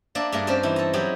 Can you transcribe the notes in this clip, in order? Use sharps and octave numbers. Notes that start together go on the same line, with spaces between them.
A#3 D4 D5 E5
G2 A3 A#3 G#4 A#4
C4 C#4 A#4 C5 D5 A5
E3 D#4 E4
A4 A#5
F#3 D#4 E4 G4 G#4